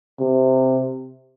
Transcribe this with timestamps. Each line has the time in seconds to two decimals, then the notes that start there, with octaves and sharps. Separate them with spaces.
0.20 C3